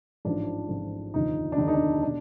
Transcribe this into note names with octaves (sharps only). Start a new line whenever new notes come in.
A1 G#2 F3 D4
A1 G#2 F3
F1 D#2 D3 F3 D#4
D4
F1 D#2 D3 F3 D#4
D#4
D4
B2 D4